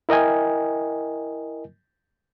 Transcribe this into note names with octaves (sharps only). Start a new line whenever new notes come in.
E4 A#4 D#5 G5 G#5